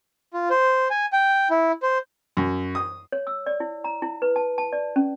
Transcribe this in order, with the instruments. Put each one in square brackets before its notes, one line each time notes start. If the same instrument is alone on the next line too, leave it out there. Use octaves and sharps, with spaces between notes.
[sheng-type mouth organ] F4
C5
G#5
G5
E4
C5
[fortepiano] F#2
D#6
[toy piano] C#5
E6
D5
E4
A#5
E4
B4
A5
A5
D5
C#4